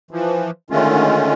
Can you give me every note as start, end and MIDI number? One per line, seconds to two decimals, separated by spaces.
0.11 0.50 52
0.11 0.50 53
0.70 1.34 50
0.70 1.34 51
0.70 1.34 56
0.70 1.34 57
0.70 1.34 61
0.70 1.34 65